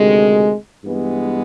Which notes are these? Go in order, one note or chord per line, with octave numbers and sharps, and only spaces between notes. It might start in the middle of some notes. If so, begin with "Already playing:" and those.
Already playing: D2 C3 D#3 G#3
G2 E3 G#3 B3